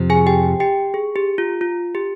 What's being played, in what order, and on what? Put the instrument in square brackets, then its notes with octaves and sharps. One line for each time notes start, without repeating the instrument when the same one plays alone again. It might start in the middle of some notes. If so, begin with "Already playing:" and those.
Already playing: [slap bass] F2 C3 F3
[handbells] G#4 G#5
G4 G5
G4 G5
G#4
G4
F4
F4
G4